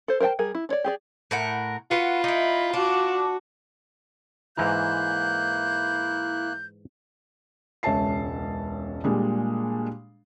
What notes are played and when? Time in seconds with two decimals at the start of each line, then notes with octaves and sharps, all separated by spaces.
0.08 A4 C5
0.20 A#4 C5 F5 G5 A5
0.39 G3 G#4 A#4
0.55 E4
0.69 D4 C#5 D5
0.84 G4 G#4 D5
1.31 A2 A#4 F#5
1.91 F4 F#4 B4 F#5
2.24 D#4 E4 B5
2.74 D4 F#4
4.57 G#2 E3 A#3 E4 A#5 F#6 G6
7.83 E1 C#2 C#5 E5 A5 C7
9.04 A#2 G3 G#3 D4